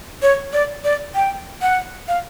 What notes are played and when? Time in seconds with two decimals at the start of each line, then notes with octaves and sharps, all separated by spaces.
0.22 C#5
0.53 D5
0.84 D5
1.15 G5
1.62 F#5
2.08 F5